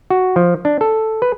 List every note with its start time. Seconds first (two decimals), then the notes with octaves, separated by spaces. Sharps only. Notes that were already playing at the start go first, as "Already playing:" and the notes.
0.10 F#4
0.36 F3
0.65 D4
0.81 A4
1.22 B4